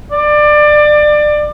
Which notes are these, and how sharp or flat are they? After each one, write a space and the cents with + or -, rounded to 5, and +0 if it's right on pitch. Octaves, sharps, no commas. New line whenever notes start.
D5 +25